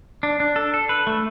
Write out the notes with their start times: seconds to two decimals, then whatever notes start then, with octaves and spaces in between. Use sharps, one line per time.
0.23 D4
0.40 D4
0.56 A4
0.74 A4
0.89 B4
1.07 A3